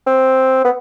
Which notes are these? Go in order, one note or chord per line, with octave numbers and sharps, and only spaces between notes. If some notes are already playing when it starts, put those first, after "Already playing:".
C4
B3